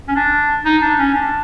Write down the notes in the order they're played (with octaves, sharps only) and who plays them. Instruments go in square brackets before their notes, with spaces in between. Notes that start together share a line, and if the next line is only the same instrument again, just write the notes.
[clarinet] C#4
D4
D#4
D4
C#4
D4